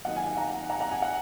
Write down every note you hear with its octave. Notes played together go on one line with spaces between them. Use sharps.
D#3 F#3 A#3 D#5 F#5
F5 G#5
F5 G#5
F#5 A#5
F#5 A#5
F#5 A#5
G#5
F#5